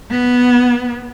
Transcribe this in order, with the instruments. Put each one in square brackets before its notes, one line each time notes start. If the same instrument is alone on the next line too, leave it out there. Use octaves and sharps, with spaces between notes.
[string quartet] B3